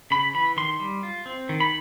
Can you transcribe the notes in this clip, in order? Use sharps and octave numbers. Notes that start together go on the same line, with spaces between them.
C#3 B5
E3 B5
D#3 C6
G3
F4
C4
D#3
B5